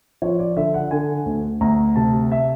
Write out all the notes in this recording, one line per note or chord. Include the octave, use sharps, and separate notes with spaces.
F3 C#5
D5
D3 E5
F#5
D3 G#5
D2
D2 A#5
C3 A5
E5